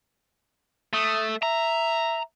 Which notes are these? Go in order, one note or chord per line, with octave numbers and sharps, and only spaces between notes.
A3 D#6
E5 A#5